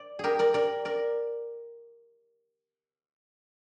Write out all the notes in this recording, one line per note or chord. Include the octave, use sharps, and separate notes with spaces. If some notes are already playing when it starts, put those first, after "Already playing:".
Already playing: D5
G4 G#4 A#4
A#4 D5
A#4 D5
A#4 D5